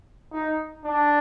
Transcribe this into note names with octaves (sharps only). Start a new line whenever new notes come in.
D#4
D4